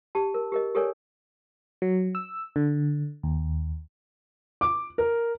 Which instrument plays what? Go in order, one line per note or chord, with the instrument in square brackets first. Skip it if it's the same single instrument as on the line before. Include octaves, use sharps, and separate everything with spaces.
[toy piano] G4 A5
A#4
G4 A#4 D#5
G4 A4 A#4 C#5 D5 G#5
[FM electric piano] F#3
E6
D3
D#2
[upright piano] D6
A#4